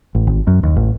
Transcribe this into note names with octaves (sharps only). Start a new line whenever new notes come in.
A1
G#1
F#2
D#2
A1